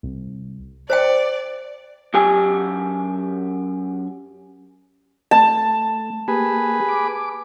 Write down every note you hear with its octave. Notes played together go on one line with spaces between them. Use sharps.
C2
C5 D5 E5 G5
F#2 G4 G#5
A3 A5
A#3 G4 G#4 B4
D6